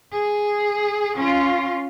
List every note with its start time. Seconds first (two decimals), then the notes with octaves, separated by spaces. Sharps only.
0.12 G#4
1.15 C#4 F4